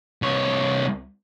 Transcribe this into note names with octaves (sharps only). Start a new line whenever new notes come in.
C2 C#5